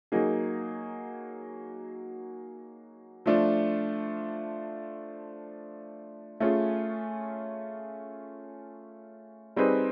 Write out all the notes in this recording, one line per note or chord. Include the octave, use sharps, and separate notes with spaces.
F#3 A#3 D#4 G#4
F3 A3 D4 F4
A3 C#4 F4 G#4
G3 C4 D#4 G#4 B4